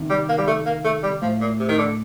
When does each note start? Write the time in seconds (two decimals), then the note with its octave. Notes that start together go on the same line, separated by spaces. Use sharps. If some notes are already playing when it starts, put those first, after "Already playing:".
Already playing: C3 D#3
0.10 G3
0.29 A#3
0.38 G3
0.47 A3
0.66 A#3
0.84 A3
1.03 G3
1.22 A2 F3
1.41 A#2
1.59 C3
1.68 D#3
1.78 D3